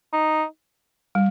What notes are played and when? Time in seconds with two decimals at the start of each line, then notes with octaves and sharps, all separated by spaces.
0.13 D#4
1.15 G3